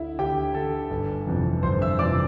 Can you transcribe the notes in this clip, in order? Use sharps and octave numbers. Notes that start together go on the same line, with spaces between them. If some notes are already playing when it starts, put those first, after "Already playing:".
Already playing: D2 D3 E4 E5
D2 G4 G5
D3 A4 A5
G1
F2 C3 E3
G1 C5 C6
E5 E6
F2 C3 E3 D5 D6